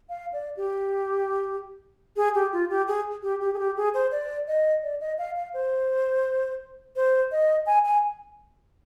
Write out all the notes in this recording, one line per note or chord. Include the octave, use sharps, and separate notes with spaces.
F5
D5
G4
G#4
G4
F4
G4
G#4
G4
G4
G#4
G4
G#4
C5
D5
D#5
D5
D#5
F5
F5
C5
C5
D#5
G#5
G#5